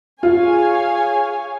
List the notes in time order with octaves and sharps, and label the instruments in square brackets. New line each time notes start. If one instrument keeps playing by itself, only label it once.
[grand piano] F4 [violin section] G#4 C#5 F5 G#5